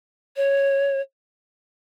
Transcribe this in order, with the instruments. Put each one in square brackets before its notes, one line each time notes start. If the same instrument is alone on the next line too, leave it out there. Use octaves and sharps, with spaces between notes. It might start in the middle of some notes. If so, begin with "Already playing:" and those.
[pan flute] C#5